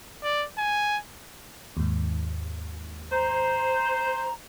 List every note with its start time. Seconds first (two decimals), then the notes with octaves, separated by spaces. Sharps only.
0.23 D5
0.58 G#5
1.77 D#2 G#2
3.12 C5 A#5